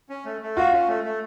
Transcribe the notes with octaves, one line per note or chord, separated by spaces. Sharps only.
C#4
A3
A3
F4 F#4
C#4
A3
A3